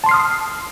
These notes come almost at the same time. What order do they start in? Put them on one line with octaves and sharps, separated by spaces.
A5 C6 C7 F6 D#6